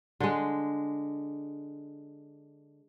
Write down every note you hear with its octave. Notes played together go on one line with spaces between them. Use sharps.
D3 G#3